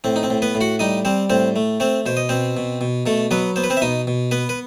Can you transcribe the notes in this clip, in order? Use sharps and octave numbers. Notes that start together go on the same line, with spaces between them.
A2 C4
D#4
C4
A2
B3 B4
A2
F#4 F#5
G3 D#4 D#5
G3 C4 C5
A2 C4 C5
A3
A3 C4 C5
B2 C5
D#5
B2 C4 C5
B2
B2
B2 A3 A4
F#3 B3 B4
B3 C5
B4
C4 C5
E5
B2 D#4 D#5
B2
B3 B4
B4